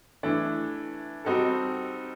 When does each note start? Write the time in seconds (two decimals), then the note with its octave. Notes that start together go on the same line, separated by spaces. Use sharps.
0.23 E3 A3 D4
1.25 G3 C4 D#4 F#4 A4